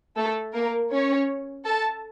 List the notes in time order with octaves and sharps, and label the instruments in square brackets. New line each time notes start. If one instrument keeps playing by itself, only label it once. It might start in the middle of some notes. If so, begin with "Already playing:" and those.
[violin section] A3 A4
A#3 A#4
C#4 C#5
A4 A5